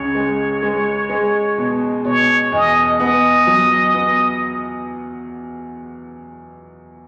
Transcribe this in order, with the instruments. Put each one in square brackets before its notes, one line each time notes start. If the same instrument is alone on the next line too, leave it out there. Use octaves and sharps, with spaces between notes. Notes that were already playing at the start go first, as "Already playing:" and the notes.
Already playing: [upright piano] C#2 C#3 [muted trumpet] C#5
[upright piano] G#3
G#3
G#3
B2
[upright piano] B2 [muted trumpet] C#5
[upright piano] E2 [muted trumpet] D#5
[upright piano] B3 [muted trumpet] D#5
[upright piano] F#3
B3